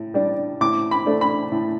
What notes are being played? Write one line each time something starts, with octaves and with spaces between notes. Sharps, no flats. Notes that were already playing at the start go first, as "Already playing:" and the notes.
Already playing: A2
G3 D4
A2 D6
B5
A3 D4
B5
A2